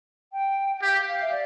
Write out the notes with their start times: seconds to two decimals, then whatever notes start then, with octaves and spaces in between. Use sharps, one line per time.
0.33 G5
0.76 G5
0.82 G4 F5
1.06 F5
1.20 E5
1.31 D5